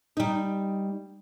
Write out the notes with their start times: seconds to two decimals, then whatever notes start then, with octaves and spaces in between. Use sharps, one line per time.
0.17 G3 D#4